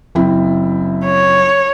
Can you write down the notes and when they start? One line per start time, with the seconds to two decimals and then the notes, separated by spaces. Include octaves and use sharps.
0.15 F#1 C4 E4
1.05 C#5